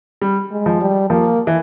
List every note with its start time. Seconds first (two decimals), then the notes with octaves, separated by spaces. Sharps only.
0.22 G3
0.51 G#3
0.66 F3
0.81 G3
1.10 F3 A#3
1.47 E3